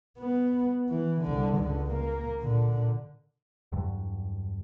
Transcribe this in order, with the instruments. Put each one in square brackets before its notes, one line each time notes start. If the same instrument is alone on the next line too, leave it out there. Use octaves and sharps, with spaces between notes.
[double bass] B3
E3
C2 D3
C#2 D3
A#3
A#2 D3
[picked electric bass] E2 G2 D3 F#3